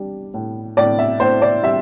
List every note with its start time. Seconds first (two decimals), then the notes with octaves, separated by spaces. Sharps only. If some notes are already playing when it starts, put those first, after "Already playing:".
Already playing: G3 D4
0.34 A2
0.77 A2 D5
0.99 E5
1.20 A2 C5
1.42 D5
1.63 G3 E5